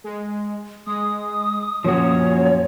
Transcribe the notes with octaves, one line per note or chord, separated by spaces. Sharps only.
G#3
G#3 D#6
F#2 A#2 F3 A#3 C#4 F#4 C#5